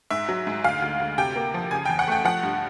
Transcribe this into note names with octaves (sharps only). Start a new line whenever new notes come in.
G#2 E5
F#3
G#2
D2 F5
D2
D2
C3 G5
A#3
F3
C#3 G#5
E2 G5
F#5
A3 G5
F3 F#5
G2